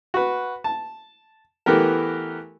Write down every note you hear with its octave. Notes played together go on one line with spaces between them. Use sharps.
F#4 B4
A5
E3 A3 B3 G4 A#4